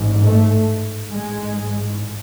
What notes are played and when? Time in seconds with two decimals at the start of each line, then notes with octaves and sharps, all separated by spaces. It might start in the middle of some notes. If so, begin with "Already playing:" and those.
Already playing: A1 G#2
0.25 A3
1.11 A1 G#2 G#3